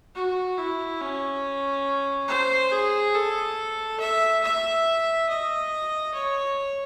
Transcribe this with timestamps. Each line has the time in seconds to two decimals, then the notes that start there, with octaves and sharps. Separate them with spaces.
0.15 F#4
0.58 E4
1.00 C#4
2.29 C5
2.72 G#4
3.15 A4
4.00 E5
4.43 E5
5.29 D#5
6.14 C#5